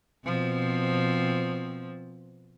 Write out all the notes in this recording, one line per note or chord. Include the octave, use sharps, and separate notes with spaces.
B2 F3 C4